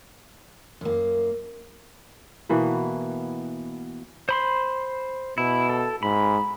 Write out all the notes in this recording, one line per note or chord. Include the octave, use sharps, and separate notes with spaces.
F#2 A#3
B2 E3 A#3 B3
C5 B5 C6
B2 E4
A4
G#2 B5